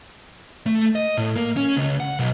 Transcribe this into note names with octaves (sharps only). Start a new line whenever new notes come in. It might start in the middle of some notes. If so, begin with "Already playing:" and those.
A3
D#5
A2
A#3
C#4
C#2
F#5
B1